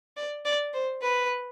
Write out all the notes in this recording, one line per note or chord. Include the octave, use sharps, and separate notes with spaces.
D5
D5
C5
B4